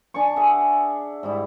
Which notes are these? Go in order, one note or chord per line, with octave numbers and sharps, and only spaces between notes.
D4 D5 G#5 C#6
G#4 E5 F#5
G#2 G3 E4